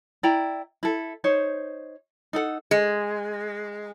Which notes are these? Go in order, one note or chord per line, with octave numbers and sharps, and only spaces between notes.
E4 D5 G5 A#5
E4 A4
D#4 C5 C#5
D#4 A4 F#5
G#3